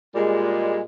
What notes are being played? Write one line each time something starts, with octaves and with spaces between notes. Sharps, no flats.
A#2 G3 G#3